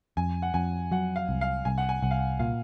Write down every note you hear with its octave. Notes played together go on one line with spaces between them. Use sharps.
F2 G#5
F#5
F2 G#5
F#3 F#5
F5
C2
F5
C2 G#5
F#5
G#5
C2 F#5
F5
F#5
A#2 F5